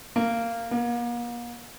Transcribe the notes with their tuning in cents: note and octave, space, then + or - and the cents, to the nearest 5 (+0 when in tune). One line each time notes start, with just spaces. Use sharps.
A#3 -15
A#3 +40